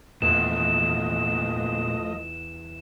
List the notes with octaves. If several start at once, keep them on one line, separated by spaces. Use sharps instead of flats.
E2 A#2 D3 F3 A3 B3 D#5 E7